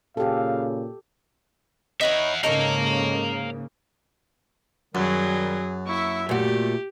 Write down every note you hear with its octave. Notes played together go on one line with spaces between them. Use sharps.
A#2 C#3 G4 A4 F5
D#4 B4 C#5 E5 F#5
G#2 C#3 A#3 D#4 A4 C#5 F5 A#5
F#2 D#3 F#3 G3 G#4
A#3 E4 E5 C#6
A#2 A3 F#4 G4